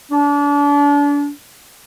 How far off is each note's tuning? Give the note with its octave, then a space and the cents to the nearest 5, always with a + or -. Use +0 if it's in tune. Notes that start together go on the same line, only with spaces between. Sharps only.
D4 -35